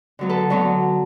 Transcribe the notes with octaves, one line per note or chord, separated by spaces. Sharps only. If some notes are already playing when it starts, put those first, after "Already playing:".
D3 F#3 B3
A4 B4
D3 F#3 B3 B4 C#5